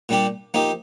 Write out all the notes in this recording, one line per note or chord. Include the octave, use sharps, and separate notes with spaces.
A#2 G3 D4 G4
F3 A#3 D#4 G4